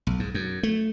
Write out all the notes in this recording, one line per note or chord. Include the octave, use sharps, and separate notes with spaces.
B1
G#2
F#2
A3